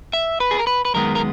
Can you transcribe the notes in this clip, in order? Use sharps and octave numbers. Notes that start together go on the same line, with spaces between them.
E5
B4
G#4
A#4
B4
B4
F#2 D#3 G#3 B3 A#4
A#4